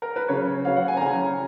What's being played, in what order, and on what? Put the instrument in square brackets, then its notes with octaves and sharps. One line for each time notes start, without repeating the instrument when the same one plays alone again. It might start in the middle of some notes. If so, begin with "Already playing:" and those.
[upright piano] A#4
B4
C#3 F#3 C#4 C#5
C#3 F#3 C#4 F5
F#5
G#5
A#5
C#3 F#3 C#4 G#5